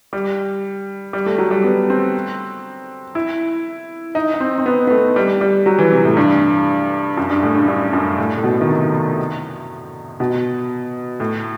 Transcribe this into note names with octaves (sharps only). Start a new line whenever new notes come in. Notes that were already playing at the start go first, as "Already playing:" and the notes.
G3
G3
A3
F#3
G3
B3
C4
E4
D#4
D#4
C4
C4
B3
B3
A3
G3
G3
F#3
E3
C3
A2
G2
F#2
G2
A2
G2
G2
F#2
A2
A2
B2
D#3
C3
B2
A2